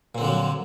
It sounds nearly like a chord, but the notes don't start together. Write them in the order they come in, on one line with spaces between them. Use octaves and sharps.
A#2 C4 D3 F3 F#3